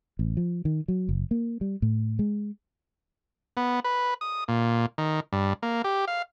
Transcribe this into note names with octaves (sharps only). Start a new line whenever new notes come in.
A1
F3
D#3
F#3
F#1
A#3
G3
A2
G#3
B3
B4
D#6
A#2
D#3
G2
A#3
G4
F5